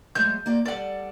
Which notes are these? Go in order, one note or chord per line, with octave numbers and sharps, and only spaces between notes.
F#3 G#3 A3 G6
A#3 F#4 D5
G3 A4 D5 F#5